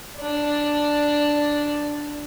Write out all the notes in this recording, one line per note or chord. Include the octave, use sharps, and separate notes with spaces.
D4 D5